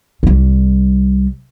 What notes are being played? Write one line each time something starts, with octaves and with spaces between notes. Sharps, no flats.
C2 G3